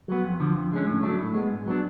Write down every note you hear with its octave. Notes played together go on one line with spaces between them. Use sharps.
F#3 B3
F2
D3 F3
F2
D3 G#3 C#4
A2
F#3 A3 D4
A2
G#3 B3
G#2
F#3 B3 D4